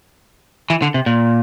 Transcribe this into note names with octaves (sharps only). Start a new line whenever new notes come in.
E3
D3
C3
A#2